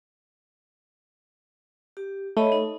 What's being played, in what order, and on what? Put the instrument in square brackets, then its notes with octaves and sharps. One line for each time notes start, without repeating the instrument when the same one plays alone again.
[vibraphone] G4
[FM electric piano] A3 [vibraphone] C#5 D#5 B5
[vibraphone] D#4